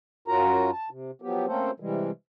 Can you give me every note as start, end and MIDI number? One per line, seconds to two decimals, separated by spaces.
0.28 0.71 42
0.28 0.71 61
0.28 0.71 65
0.28 0.71 66
0.28 0.71 70
0.28 0.71 82
0.72 0.89 81
0.90 1.11 48
1.22 1.46 53
1.22 1.46 54
1.22 1.46 59
1.22 1.46 67
1.47 1.71 57
1.47 1.71 58
1.47 1.71 60
1.47 1.71 61
1.47 1.71 69
1.47 1.71 72
1.80 2.11 48
1.80 2.11 52
1.80 2.11 55
1.80 2.11 56